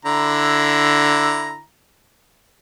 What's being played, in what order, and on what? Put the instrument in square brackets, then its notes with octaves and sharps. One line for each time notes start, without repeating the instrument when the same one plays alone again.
[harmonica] D3 E4 A#5